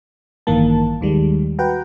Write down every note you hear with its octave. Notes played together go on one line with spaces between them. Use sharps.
A1 G2 D#3 E3 A#3 A5
D#2 D#3 G3 G#3
F#4 B4 F#5 G5 A#5